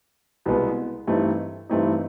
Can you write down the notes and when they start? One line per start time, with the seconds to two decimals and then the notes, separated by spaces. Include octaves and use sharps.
0.46 C2 B2 G#3 B3
1.07 G2 E3 A3 C4 D#4
1.69 G2 E3 A3 C4 D#4